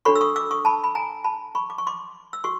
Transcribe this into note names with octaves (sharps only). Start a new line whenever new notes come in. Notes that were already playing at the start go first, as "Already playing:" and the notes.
D4 F#4 A4 C#5 B5 C#6
E6
C#6 D#6
D6 E6
C#6 D#6
A5 B5
B5
G#5 A#5
A5 B5
B5 C#6
D6
C#6
C6 D6
E6
F#4 C#6